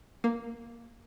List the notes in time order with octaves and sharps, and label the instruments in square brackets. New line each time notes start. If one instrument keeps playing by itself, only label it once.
[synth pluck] A#3